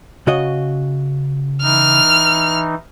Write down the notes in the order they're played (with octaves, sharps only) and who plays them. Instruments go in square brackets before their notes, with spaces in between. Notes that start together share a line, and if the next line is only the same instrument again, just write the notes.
[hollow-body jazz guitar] C#3 F#4 D#5
[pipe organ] E3 D#4 [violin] F6